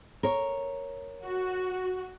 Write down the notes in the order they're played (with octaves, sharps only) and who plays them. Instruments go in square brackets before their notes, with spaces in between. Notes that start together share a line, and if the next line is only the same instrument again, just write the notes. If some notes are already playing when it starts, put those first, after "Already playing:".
[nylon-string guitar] A#4 C#5
[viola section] F#4